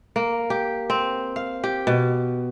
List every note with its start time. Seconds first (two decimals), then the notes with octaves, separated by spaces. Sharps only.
0.16 A#3
0.50 G4
0.90 C4
1.36 F5
1.64 G4
1.87 B2